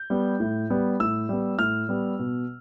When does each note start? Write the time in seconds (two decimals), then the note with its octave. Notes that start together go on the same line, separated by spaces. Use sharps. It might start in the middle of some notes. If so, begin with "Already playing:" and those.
Already playing: G6
0.10 G3 B3
0.40 A2
0.70 G3 B3
1.00 A2 E6
1.29 G3 B3
1.59 A2 F6
1.89 G3 B3
2.19 B2